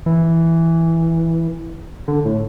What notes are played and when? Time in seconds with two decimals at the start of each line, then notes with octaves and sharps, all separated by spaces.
0.06 E3
2.08 D3
2.25 A2